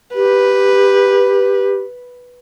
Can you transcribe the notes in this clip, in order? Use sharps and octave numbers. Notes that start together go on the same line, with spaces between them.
G4 B4